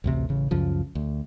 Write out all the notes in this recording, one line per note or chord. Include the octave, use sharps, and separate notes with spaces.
A1 D2 C3
A1 C#3
C#2 F#2 C#3 F3
D2